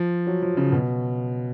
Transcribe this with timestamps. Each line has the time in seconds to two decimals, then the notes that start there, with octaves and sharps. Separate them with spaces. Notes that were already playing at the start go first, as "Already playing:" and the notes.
Already playing: F3
0.27 F#3
0.42 F3
0.57 C#3
0.72 B2